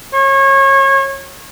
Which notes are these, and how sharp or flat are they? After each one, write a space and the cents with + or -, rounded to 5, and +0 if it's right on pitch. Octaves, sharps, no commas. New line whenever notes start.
C#5 -30